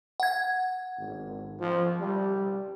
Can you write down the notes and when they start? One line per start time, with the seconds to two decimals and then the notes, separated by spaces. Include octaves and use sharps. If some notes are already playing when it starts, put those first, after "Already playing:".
0.20 F#5 G#6
0.98 G#1
1.60 F3
2.00 G3